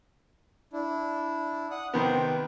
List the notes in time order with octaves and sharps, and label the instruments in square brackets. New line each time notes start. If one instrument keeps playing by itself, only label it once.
[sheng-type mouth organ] D4 E4
F#5 D#6 F#6
[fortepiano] C3 D#3 B3 [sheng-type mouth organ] C5